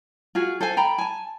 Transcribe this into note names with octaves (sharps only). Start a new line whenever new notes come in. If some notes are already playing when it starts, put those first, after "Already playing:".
F4 F#4 G#4
A4 C5 F5 G#5
G5 A#5 B5
G#5 A5